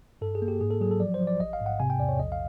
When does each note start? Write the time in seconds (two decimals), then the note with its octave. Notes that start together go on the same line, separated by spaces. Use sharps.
0.21 G2 A4
0.35 G#4
0.42 A#3
0.48 G4
0.61 G#2 G#4
0.70 A4
0.81 F#3 G#4
0.91 A4
1.00 F3 D5
1.14 C5
1.20 F3
1.27 D5
1.40 A1 D#5
1.53 F5
1.60 G#2
1.66 F#5
1.80 C3 G#5
1.90 G5
1.99 E2 D5
2.09 C#5
2.19 A#1 D#5
2.32 F5